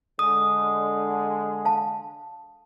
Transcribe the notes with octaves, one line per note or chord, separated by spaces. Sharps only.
D3 G#3 D#6
F5 A5